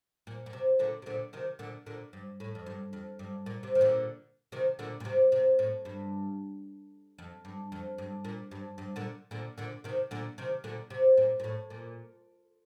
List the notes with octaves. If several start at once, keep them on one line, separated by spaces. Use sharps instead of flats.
A#2
A#2
C3
A#2 D3
C3
A#2 D3
C3 D#3
A#2 D3
A#2 D3
G2
A2
F2
G2
F2
G2
A#2
C3
D#3
A#2 D3
C3 D#3
A#2 D3
A#2
C3
C3
A2
G2
F2
G2
F2
G2
A#2
G2
G2
A#2 D3
A#2 D3
A#2 D3
C3 D#3
A#2 D3
C3 D#3
A#2 D3
C3
A#2
A#2
A2
A#2